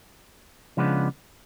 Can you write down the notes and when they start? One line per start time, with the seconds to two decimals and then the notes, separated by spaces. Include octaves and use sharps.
0.77 C#3 F3 G#3 B3 D4